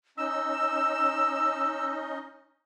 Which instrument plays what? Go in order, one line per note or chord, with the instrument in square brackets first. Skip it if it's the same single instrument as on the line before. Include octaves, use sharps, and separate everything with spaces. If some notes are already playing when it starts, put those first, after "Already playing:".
[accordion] C#4 D#4 D#5 [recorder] E6